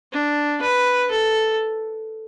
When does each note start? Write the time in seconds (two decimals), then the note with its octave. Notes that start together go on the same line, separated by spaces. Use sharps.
0.12 D4
0.62 B4
1.11 A4